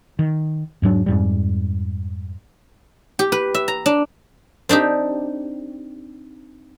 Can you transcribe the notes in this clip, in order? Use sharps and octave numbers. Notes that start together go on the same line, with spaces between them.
D#3
E2 G#2 F#3 D4
F2 G#2 G3
G4
B4
E5
A#5
D4
C4 D4 D#4 G4